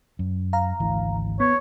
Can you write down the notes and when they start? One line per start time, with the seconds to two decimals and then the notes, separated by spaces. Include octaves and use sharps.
0.19 F#2
0.53 F5 A#5
0.80 G#1 D2 E3
1.40 B3 C#5